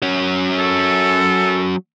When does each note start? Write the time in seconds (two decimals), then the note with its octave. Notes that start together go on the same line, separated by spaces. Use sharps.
0.02 F#3 C#4
0.59 A4